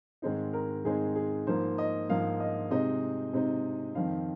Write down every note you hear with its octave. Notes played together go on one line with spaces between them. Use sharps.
G#2 D#3 G#3 C4 D#4
A#4
G#2 D#3 G#3 C4 D#4 G#4
G#4
G#2 F3 A#3 C5
D#5
G#2 F3 A#3 F5
D#5
C3 G#3 C4 D#4 D#5
C3 G#3 C4 D#4
F2 D#3 C4 F5